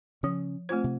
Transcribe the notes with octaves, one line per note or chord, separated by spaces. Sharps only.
C#3 F3 C#4
A3 C4 F4 C5
C3